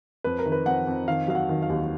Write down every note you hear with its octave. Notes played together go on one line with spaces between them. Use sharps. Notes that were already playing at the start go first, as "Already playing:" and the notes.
F2 B4
A#4
D#3
B4
F2 F#5
F2
D#3 F5
F#3 F5
F#5
D#3
F5
D#2